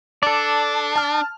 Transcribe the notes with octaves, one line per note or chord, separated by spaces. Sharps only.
D4 A4 D5
A5 F6